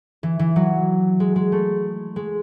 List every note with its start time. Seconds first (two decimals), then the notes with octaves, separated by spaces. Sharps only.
0.23 E3
0.39 E3
0.56 F#3
1.20 G#3
1.36 G#3
1.52 A3
2.16 G#3